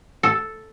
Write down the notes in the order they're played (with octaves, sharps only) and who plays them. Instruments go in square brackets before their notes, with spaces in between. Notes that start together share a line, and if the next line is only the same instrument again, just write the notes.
[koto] A4